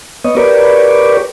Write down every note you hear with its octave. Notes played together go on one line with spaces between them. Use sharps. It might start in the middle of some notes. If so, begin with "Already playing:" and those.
B3 C#5 D#5
G4 A#4 B4 C#5 D5